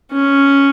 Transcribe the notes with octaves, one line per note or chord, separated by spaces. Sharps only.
C#4